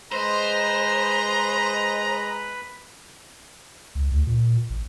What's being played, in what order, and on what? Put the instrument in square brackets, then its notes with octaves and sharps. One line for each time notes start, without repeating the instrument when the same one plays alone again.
[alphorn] G#3 [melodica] B4 B5 [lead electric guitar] C5 [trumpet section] D#5 A#5
[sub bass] C#2
D2
A#2
A1